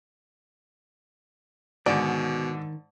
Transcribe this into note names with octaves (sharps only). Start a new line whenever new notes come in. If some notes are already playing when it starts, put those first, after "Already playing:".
G#2 B2 D3 D#3 D5